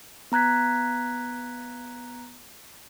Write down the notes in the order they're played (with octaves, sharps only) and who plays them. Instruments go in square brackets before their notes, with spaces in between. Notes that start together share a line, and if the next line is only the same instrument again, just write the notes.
[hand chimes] B3 A#5 F#6 G#6 B6